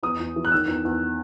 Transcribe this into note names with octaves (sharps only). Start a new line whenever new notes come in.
E2 D#6
E2
E3
F#6
D#3 E6
E2
E2